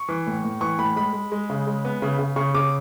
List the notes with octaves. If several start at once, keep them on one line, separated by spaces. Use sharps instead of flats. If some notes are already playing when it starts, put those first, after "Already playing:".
Already playing: C#6
E3
A2
A2
E3 C#6
A2 B5
G#3 B5
G#3
G#3
C#3
G#3
B3
C#3
C#3
C#3 C#6
C#3 D6